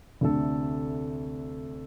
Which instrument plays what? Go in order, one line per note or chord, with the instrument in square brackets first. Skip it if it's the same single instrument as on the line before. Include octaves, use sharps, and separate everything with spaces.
[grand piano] D2 C3 A3 D4 A4